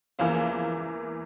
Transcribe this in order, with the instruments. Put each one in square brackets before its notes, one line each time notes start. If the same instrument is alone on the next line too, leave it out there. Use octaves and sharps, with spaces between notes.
[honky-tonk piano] E2 E3 A#3 [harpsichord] C#3 F3